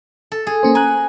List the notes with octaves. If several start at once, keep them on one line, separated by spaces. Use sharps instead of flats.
A4
G#4
A#3 C#4 C5
G#5 A#5 F#6